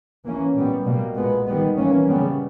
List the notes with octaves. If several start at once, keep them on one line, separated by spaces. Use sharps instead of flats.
E3 A#3 C#4
A#2 G3 B3
B2 G3 A#3
A#2 G#3 B3
D#3 G3 B3
E3 A#3 C#4
C#3 G3 B3